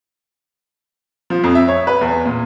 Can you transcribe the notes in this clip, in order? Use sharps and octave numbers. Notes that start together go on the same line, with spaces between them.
F3
F2
E5
C#5
B4
E2
A#2